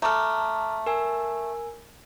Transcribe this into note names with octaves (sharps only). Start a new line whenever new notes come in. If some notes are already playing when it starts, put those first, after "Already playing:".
A3 A4 A#5 D6 F6
A#4 G#5 E6